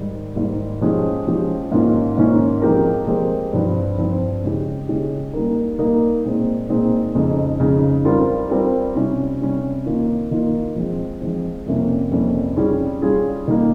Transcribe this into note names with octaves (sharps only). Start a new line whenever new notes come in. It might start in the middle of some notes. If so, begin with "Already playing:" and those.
Already playing: G#2 D#3 G3
G#2 D#3 G3
F3 G#3 C#4 G4
F3 G#3 C#4 G4
G#2 D#3 A#3 C#4 F4
G#2 D#3 A#3 C#4 F4
F3 G#3 C4 G4 A#4
F3 G#3 C4 G4 A#4
G2 F3 C4 F4
G2 F3 C4 F4
C#3 G#3 C#4 G4
C#3 G#3 C#4 G4
G3 A#3 D#4 A#4
G3 A#3 D#4 A#4
A#2 G#3 C4 D#4
A#2 G#3 C4 D#4
F2 C#3 G#3 D#4
F2 C#3 G#3 D#4
G3 C4 F4 A#4
G3 C4 F4 A#4
C3 G3 C#4
C3 G3 C#4
D#3 A#3 F4
D#3 A#3 F4
F3 G#3 C4
F3 G#3 C4
F2 C3 G3 A#3 C#4
F2 C3 G3 A#3 C#4
G3 C#4 F4 G#4
G3 C#4 F4 G#4
D#3 G3 A#3